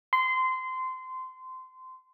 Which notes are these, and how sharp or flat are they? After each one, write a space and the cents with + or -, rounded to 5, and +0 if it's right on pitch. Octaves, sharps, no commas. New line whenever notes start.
C6 -20